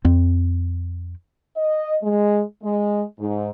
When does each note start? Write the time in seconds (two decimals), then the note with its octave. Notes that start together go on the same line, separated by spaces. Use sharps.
0.05 F2 C4
1.57 D#5
2.02 G#3
2.63 G#3
3.19 G#2